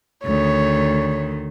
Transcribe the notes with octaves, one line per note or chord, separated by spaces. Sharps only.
D2 D#3 C#5